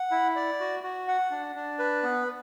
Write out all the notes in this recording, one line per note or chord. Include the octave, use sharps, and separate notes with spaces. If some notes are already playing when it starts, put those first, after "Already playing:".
Already playing: F#5
E4
D5
F#4
F#4
F#5
D4
D4
B4
B3